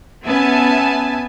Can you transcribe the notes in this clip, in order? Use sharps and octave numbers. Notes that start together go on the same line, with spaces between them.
B3 C#4 E5 G#5 A5